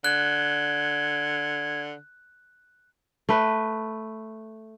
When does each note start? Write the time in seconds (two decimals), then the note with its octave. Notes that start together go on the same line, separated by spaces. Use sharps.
0.04 D3 F#6 G#6
3.29 A3 B4